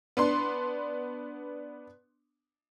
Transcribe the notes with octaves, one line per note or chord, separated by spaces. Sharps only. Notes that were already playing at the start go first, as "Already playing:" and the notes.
B3 D4 C6